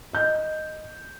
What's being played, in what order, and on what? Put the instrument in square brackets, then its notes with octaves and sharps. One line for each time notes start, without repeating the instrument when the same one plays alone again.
[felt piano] D#5 G6